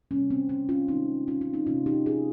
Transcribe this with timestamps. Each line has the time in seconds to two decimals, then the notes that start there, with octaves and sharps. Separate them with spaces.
0.11 C3 G3 A#3 C#4
0.30 C4
0.49 C#4
0.69 C#4 F4
0.88 D#3 G#3 C4 D#4
1.28 C#4 F4
1.41 C#4 F4
1.53 C4 D#4
1.67 C3 F3 A#3 C#4 F4
1.86 D#4 G4
2.06 F4 G#4